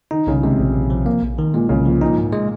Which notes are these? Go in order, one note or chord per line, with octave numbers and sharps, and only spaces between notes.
D#3 D#4
C2 C#3
C3 G#3
A#1
A#1
F3
A#3
A#1
D#3
A#2 G#3
C2 C#3
A#2 F3
A#2 D#4
G#2
G#3